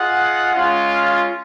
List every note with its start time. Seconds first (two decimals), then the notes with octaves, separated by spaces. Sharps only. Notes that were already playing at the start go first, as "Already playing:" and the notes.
Already playing: F4 G#4 D#5 F#5
0.55 G#3 C#4 F4